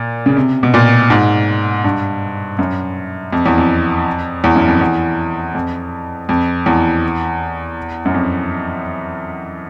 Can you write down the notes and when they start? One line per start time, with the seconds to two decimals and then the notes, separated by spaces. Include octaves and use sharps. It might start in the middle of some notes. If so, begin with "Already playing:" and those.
Already playing: A#2
0.26 C#3
0.37 C3
0.63 B2
0.74 A#2
1.10 G#2
1.84 G2
2.59 F#2
3.33 F2
3.46 E2
3.58 F2
4.44 E2
4.56 F#2
4.68 F2
4.81 E2
5.55 F2
6.29 F2
6.66 E2
8.05 F#2
8.14 F2